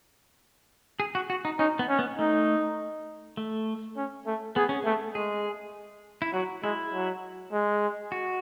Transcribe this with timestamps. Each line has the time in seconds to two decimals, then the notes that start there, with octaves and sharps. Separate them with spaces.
1.00 G#4
1.15 F#4
1.30 F#4
1.45 D#4
1.59 C#4 D#4
1.79 B3
1.89 C#4
1.99 B3
2.19 A3 D#4
3.37 A3
3.97 C#4
4.27 A3
4.56 B3 G#4
4.69 C#4
4.82 A3 B3
5.15 G#3 G#4
6.22 E4
6.33 F#3 F#4
6.63 G#3 E4
6.94 F#3
7.52 G#3
8.12 F#4